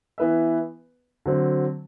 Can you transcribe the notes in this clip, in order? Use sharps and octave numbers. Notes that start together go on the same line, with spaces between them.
E3 B3 E4 B4 E5
D3 F#3 C4